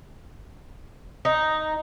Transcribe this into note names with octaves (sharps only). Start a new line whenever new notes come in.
D#4